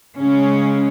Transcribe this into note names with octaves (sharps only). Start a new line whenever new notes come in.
C#3 G#3 C#4